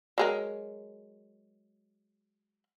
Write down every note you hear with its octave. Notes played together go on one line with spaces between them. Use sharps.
F#3 G#3 A#4